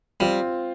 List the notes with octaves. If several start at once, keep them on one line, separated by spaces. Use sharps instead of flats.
G3 C4 F4